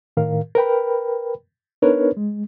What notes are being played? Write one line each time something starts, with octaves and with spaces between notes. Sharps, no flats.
A2 D#3 A#4 F5
A#4 B4 G5 B5
B3 D4 D#4 A#4 B4 C#5
G#3